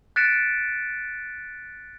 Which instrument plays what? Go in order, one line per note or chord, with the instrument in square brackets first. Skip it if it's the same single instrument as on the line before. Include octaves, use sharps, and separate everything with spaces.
[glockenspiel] F#6 A6 B6 C#7 D7 E7